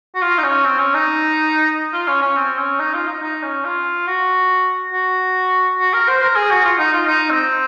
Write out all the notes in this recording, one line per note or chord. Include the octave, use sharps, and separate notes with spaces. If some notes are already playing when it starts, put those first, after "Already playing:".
F#4
F4
D#4
C#4
C4
C#4
D#4
F4
C#4
C#4
C4
C#4
D#4
F4
D#4
D#4
C#4
F4
F#4
F#4
F#4
A#4
C5
A#4
G#4
F#4
F4
D#4
F4
D#4
C4